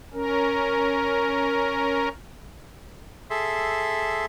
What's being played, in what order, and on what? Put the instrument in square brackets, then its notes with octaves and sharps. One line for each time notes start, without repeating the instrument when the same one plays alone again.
[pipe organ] C#4 A#4
[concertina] G#4 A4 E5 C6